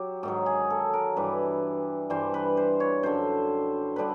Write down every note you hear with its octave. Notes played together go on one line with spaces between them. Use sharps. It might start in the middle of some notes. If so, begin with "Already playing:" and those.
Already playing: F#3 G4
G#2 D#3 F#3
G#4
A4
A#4
G2 E3 G3 B4
G2 E3 G3 C5
B4
C5
C#5
F#2 D3 G3 C5
D3 G3 B4